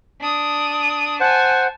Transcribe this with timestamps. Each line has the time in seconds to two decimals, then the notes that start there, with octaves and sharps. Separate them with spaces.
0.21 D4 D#6
1.20 C5 F#5 G#5 A5